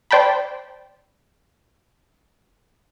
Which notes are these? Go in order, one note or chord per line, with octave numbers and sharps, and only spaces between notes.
C5 D5 G5 A5 B5